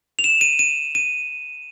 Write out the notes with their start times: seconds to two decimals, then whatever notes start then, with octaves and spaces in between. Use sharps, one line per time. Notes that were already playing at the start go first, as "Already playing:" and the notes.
0.19 F7
0.24 E7
0.41 D#7
0.59 D#7
0.95 D#7